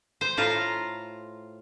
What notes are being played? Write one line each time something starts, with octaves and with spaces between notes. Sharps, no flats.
C5
A2 F4 F5 A#5